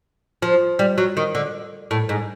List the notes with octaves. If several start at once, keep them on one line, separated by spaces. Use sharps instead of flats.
F3
G3
F#3
D#3
D3
A2
G#2